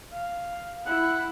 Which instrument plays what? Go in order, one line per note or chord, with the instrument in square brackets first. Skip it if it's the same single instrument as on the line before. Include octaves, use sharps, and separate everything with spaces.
[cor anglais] F5
[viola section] E4 B5 [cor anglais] F#5